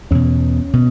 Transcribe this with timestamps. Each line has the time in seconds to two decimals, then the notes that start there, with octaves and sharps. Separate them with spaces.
0.11 E2 B2 C#4
0.73 B2